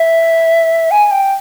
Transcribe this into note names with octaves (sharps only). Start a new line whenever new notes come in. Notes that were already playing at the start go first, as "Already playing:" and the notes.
Already playing: E5
G#5
G5